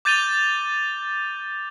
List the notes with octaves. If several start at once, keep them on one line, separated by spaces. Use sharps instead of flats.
D6 G6 A6 D#7 F7 G7